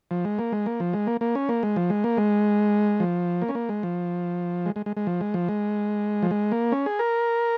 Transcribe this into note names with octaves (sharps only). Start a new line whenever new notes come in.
F3
G#3
A#3
G#3
A#3
F3
G#3
A#3
A#3
C#4
A#3
G#3
F3
G#3
A#3
G#3
F3
A#3
C#4
A#3
G#3
F3
G#3
G#3
G#3
G#3
F3
G#3
F3
G#3
F3
G#3
A#3
C#4
G#4
A#4